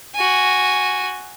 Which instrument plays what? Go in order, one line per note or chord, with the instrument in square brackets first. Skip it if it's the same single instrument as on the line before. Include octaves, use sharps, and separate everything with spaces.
[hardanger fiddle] F#4 G#5